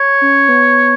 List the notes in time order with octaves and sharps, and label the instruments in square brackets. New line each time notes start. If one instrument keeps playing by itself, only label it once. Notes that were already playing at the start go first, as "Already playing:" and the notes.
Already playing: [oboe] C#5
[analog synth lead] C#4
B3